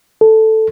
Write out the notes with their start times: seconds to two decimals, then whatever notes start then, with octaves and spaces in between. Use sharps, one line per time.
0.21 A4